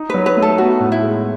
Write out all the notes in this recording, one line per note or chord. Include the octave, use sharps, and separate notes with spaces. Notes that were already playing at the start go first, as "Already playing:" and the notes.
Already playing: D#4
F#3 B4
B4
A3
A4
B3 F#4
A2
E4
G#3